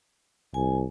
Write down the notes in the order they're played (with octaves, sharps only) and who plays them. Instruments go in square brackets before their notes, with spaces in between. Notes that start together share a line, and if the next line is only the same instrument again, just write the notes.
[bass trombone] C2 [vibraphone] G#5